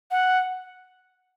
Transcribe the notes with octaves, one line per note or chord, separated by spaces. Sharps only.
F#5